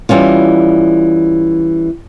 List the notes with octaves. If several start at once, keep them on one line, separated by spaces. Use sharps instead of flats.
E3 G3 C#4 F4